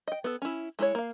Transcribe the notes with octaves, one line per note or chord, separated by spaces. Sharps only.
D#5 G5
B3 A4
C#4 E4
G#3 E4 A#4 C#5
A#3 F5